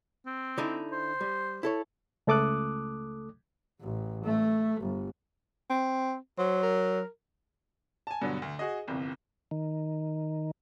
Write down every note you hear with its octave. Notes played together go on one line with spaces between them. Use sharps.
C4
D3 D#4 E4
C5
G3
E4 A4 C#5
C#2 A3 A4 D6 D#6 F#6
A1
A3
G1
C4
F#3 C5
A#4
G#5 A5
G2 B2 D3 F#3
D2
F#4 G#4 D#5
G1 C2 F2
D#3